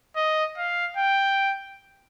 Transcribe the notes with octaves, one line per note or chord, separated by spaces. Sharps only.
D#5
F5
G5